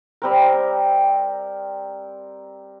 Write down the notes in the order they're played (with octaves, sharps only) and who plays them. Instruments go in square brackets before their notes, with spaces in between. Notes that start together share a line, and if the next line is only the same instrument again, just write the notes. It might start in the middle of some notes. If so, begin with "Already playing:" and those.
[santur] G3 C4 A#4